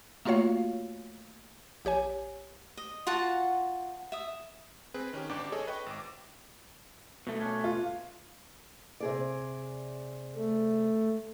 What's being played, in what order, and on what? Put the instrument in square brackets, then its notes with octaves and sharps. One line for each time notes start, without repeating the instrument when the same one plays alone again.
[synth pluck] A3 A#3 F4 F#4 C#5 F5
A#1 G4 C#5 G#5
[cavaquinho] D#5
F4 F#4 F#5 A5
E5 D#6
[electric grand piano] C4 G#4 B4
D#3 C#4 G4
G1 D4 G4 D6
G#4 A4 C#5 D#5
B4 D#5 G5 C#6
G#1 D6
[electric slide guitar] B2 A3
[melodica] C#4 D4 C#5
[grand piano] F4
[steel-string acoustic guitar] C3 G#4 D5
[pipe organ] A3